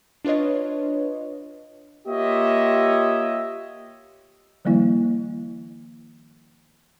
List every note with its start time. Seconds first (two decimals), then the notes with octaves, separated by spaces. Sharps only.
0.25 D4 F4 B4 C#5 D#5
2.08 A#3 F4 G4 C#5 D#5 E5
4.65 D#3 F3 G3 A#3 E4